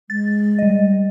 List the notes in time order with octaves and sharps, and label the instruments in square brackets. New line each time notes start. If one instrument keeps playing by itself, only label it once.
[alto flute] G#3 [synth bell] A6
[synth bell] G3 D#5